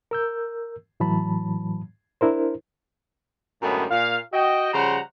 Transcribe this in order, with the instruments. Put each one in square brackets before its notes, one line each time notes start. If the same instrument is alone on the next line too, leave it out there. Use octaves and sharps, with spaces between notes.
[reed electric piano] A#4 E6 G6
A2 E3 F#3 A5 B5
D4 E4 A#4 C5
[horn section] F#2 A2 D3 G3 G#3 B3
A#2 F5
F#4 D#5 G5
C#3 F3 G3 C5 F#5 A#5